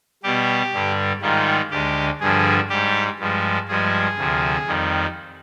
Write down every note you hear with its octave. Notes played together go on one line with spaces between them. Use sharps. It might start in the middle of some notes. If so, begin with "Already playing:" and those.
B2 G3 G4
G2 D3 G3
G#2 D#3 G3 F4
D2 D3 G#3 G4
G2 D3 F3 G#4
G#2 G3 G4
G2 F3 G#3
G2 F3 G#3 G#4
D2 C3 F3
F2 D#3 G3